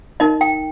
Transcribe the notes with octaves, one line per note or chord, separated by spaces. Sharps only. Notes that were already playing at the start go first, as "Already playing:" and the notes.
D#4 A#4 D#5
G5